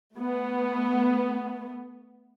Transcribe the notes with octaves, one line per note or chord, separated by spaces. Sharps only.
A3 B3